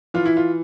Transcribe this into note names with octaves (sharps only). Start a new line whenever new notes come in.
E3 F4
E4
F4